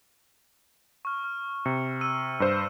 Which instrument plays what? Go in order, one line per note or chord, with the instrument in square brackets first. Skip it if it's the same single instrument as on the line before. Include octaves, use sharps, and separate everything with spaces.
[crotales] C#6 F6
F6
[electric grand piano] C3 [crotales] C#7
[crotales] E6 D#7
[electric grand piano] G2 C5